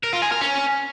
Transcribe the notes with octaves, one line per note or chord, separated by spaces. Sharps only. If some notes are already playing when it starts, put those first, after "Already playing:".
A#4
F4
G#4
A#4
C#4